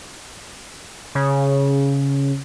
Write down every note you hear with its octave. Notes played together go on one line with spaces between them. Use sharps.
C#3